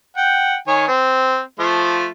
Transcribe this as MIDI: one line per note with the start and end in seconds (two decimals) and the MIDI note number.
0.17 0.55 78
0.17 0.55 79
0.68 0.86 51
0.68 0.86 73
0.68 0.86 80
0.88 1.39 60
1.59 2.08 53
1.59 2.08 57
1.59 2.08 65